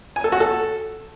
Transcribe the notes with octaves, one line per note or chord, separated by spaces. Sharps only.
G#5
A4
F#4
A4